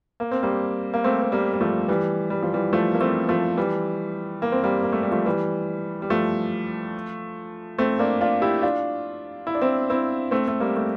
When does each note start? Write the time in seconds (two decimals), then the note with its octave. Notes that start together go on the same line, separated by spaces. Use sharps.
0.20 A#3
0.31 C4
0.43 G3 A#3
0.94 A#3
1.04 A3 C4
1.22 C4
1.32 G3 A#3
1.53 G3
1.61 F3 A3
1.88 E3 G3
2.30 G3
2.43 F3
2.53 E3 G3
2.73 F3 A3
2.94 A#3
3.01 A3 C4
3.29 F3 A3
3.57 E3 G3
4.42 A#3
4.52 C4
4.63 G3 A#3
4.83 A#3
4.92 A3
5.03 G3
5.11 F3 A3
5.26 E3 G3
6.02 G3
6.10 F3 A3
7.78 A3 C4
7.99 A#3 D4
8.21 D4 F4
8.42 E4 G4
8.62 D4 F4
9.47 E4
9.55 D4
9.61 C4 E4
9.90 C4 E4
10.31 A3 C4
10.48 A3
10.60 G3 A#3
10.76 A3